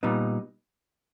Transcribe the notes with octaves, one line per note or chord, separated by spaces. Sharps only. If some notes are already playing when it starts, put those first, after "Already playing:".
A#2 G3 B3 D#4